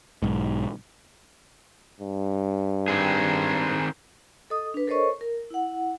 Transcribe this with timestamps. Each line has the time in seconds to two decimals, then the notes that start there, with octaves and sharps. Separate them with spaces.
0.22 B1 G#2
2.00 G2
2.88 D#3 C4 G#4
4.50 A4 D#5 D#6
4.74 D4 B4
4.87 A4 A#4 C5 C#5 D#5 C#6
5.21 A#4
5.50 E4 F#5